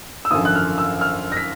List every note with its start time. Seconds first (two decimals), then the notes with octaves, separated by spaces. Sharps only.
0.25 E6
0.31 G#1 F#2 D3 F3 D#6
0.45 F#6
0.55 F6
0.78 E6
1.01 F6
1.32 A#6
1.37 B6